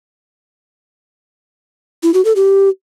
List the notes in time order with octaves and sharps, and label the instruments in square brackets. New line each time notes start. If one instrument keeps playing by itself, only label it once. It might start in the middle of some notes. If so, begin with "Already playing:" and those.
[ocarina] E4
F#4
A4
G4